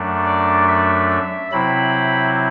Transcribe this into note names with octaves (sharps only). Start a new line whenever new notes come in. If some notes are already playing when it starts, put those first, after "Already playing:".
Already playing: F#2 F#3 A3 D4
D5
E5
E5
C3 F#3 C4 E4 B5